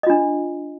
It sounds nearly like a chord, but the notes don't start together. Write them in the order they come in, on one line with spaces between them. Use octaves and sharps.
D#5 F4 D4